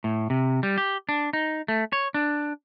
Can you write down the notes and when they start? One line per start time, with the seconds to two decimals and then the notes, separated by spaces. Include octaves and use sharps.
0.04 A2
0.30 C3
0.63 G3
0.78 G4
1.09 D4
1.33 D#4
1.68 A3
1.93 C#5
2.14 D4